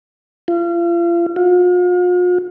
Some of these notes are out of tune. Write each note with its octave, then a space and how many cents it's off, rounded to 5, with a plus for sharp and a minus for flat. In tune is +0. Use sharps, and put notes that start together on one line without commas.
F4 -35
F4 +45